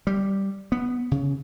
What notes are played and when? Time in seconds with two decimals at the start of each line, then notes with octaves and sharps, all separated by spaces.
0.07 G3
0.72 B3
1.11 C#3